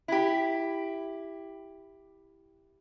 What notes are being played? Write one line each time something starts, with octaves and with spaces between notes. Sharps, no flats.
E4 G4